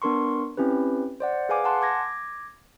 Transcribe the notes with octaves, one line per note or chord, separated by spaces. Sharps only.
B3 D4 A#4 C6 C#6
C4 C#4 E4 G4 B4
C5 D5 F#5
G#4 B4 F5 G#5 D6
F#5 G#5 A5 C6 F#6
D6 G#6 A#6